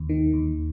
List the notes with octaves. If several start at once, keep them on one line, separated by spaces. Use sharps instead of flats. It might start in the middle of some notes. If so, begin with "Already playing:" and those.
Already playing: D#2
D#3
D#2